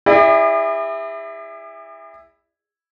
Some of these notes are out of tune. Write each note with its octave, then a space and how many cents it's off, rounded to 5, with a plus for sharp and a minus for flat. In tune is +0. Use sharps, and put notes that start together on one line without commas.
E4 +0 G#4 -45 D5 +45